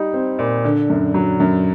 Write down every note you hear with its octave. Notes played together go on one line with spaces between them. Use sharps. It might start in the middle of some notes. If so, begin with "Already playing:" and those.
Already playing: G3 D#4
C4
A#2
D3
F#2
F#3
F#2